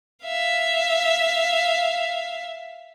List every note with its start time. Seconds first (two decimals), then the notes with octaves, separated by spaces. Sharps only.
0.25 E5 F5